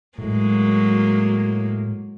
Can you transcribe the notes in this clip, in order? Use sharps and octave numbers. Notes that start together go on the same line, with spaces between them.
A2 F#3 G#3 A#3